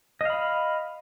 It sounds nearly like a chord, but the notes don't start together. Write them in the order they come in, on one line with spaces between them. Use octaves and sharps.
D#5 F5 B5